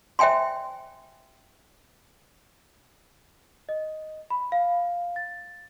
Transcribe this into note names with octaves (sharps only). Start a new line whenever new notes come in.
C5 E5 G5 G#5 C6
D#5
B5
F5
A6